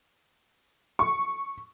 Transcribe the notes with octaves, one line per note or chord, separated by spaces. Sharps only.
C#6